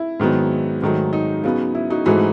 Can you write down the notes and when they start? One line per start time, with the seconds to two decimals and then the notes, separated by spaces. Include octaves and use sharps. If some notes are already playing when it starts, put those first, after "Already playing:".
Already playing: E4
0.20 G#2 D#3 F#3 B3
0.82 G#2 D#3 F#3 A3
1.13 D#4
1.44 C#3 F#3 B3
1.75 E4
1.90 D#4 F#4
2.06 G#2 E3 A3 D#4 F#4